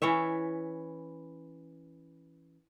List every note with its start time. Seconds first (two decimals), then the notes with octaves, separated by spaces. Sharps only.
0.02 E3 C#4 C#5 E5